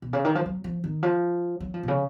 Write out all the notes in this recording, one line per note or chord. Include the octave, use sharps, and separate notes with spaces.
B2
C#3
D#3
F3
F#3
F3
D#3
F3
F#3
F3
B2
C#3